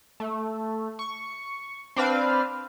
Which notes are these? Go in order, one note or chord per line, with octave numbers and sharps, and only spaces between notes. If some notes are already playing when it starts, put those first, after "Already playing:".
A3
C#6
C4 D4 B4 F5